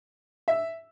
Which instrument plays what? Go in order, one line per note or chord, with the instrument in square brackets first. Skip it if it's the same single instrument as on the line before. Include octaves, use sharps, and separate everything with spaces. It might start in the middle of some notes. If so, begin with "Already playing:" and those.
[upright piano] E5